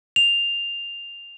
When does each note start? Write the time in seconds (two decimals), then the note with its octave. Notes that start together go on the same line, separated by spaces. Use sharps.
0.16 F7